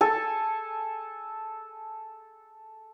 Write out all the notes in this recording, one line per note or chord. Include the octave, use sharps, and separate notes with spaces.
A4 G#5